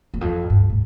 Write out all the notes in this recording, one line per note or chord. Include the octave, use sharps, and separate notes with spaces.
E2
F2
G2
A2